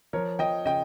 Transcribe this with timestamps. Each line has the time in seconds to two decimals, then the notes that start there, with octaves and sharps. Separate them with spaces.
0.13 F3 A#4 C#5
0.39 F3 D#5 G5
0.66 C#3 D#5 G5